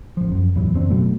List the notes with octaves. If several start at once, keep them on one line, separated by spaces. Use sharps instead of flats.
A1 F3
F#2
E2 A2 E3 F#3
F#1 C4 D4
B2 F#3 A3